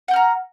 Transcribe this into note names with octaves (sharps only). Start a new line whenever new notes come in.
F#5 G5 A#5 F6